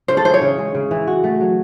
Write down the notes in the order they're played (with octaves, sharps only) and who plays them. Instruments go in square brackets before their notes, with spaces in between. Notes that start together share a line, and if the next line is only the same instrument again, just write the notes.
[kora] C#3 [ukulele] C5
[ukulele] A4
[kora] E3 [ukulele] C5
[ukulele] C#5
[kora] C#3
G#3
C#3
E3
F#4
A3
F#3